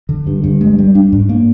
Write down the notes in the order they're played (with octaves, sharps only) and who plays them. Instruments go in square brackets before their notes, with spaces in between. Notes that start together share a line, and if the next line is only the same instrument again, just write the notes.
[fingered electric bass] D3
G2
G2
G#3
G3
D4
G#2
A#3